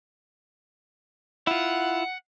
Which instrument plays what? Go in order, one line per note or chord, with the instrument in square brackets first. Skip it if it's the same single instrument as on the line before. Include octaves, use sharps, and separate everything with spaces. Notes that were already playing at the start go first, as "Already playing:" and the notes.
[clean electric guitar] E4 F4 [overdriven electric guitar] F#5